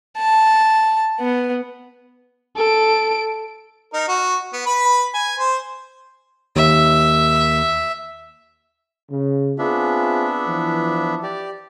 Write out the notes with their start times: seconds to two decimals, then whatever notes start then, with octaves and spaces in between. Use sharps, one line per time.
0.18 A5
1.20 B3
2.57 A4 D7
3.94 D#4 A#4
4.08 F#4
4.53 B3
4.66 B4 B5
5.14 G#5
5.37 C5
6.56 D#2 E5
9.11 C#3
9.59 B3 C4 D4 F4 G#4 E5
10.47 E3 F3
11.23 G4 D5